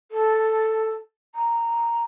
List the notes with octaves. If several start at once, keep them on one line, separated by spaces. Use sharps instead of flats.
A4
A#5